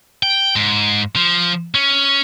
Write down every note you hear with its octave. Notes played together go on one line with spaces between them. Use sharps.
G5
G#2
F3
C#4